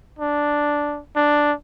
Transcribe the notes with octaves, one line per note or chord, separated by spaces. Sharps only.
D4
D4